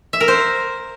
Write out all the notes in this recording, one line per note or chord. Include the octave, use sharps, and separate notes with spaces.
E5
A#4
C5